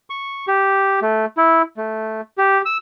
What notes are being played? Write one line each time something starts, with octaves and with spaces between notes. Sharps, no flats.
C#6
G4
A3
E4
A3
G4
E6